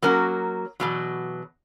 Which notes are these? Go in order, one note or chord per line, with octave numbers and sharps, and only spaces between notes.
F#3 A#3 C#4 F#4 A#4
E2 B2 F#3